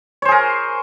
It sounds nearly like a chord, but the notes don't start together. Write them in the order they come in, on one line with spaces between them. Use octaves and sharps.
C#5 C5 G#4 A#4